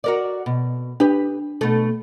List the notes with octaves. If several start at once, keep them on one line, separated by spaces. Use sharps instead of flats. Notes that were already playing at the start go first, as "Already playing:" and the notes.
F#4 A#4 D5
B2
D4 G4 B4
B2 A3